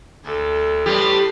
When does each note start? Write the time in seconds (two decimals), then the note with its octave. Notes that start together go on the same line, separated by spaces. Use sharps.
0.24 D2 A4
0.86 A2 G3 G4 B4 C6 A6